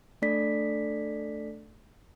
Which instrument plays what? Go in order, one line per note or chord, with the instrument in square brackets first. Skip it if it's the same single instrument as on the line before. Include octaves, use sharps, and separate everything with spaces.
[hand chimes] A3 D4 A4 D5 B6